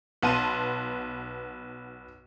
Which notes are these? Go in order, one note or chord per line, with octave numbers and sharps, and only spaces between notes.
B1 B3 A5 C6 D#7